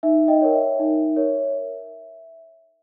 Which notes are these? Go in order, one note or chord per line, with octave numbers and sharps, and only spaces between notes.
D#4 E5
D#5 G5
A#4 C#5
E5
D#4
A#4 C#5